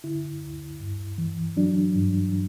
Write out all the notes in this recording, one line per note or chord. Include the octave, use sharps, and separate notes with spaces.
D3 E4
D2
G2
E3
F#3 D4
G2